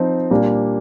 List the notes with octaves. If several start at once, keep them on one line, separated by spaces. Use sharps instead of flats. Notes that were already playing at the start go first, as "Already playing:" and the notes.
Already playing: F3 C4 D#4
A#2 G3 A#3 D4